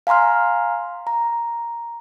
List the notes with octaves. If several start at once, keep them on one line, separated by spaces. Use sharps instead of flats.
F5 G#5 A#5 C6 F6
A#5